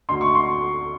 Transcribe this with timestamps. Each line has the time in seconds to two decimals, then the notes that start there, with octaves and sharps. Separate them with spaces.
0.09 D2 D3 C6
0.21 C#6
0.35 C6